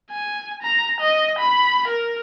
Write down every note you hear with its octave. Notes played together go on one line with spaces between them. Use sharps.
G#5
A#5
D#5
B5
A#4